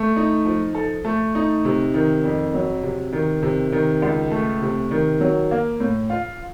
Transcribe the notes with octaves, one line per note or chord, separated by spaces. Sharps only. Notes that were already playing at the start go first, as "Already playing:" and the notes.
Already playing: A3
D#4
F3
A4
A3
D#4
C3
D#3
F2
F#3
C3
D#3
C3
D#3
C#2
A3
C3
D#3
F#3
A#3
A2
F4